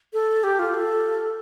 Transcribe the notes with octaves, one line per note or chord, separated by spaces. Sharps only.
A4
G4
F4
A4